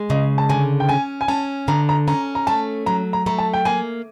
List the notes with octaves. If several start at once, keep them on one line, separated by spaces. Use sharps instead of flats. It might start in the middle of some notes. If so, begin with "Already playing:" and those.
Already playing: G#3
C#3 D#5
A5
D3 G#5
G5
C#4 G#5
G#5
C#4 A5
D3 A#5
A#5
C#4 A#5
A#5
A3 A5
F#3 A#5
A#5
A3 A#5
A5
G5
A#3 G#5